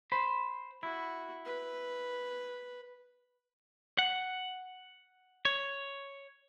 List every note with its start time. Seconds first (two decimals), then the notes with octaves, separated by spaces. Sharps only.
0.12 C5 B5
0.83 E4 F#4
1.45 B4
3.99 F#5
5.45 C#5